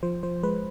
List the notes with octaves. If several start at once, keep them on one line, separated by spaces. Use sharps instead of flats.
F3 C5
F3 C5
G#3 B4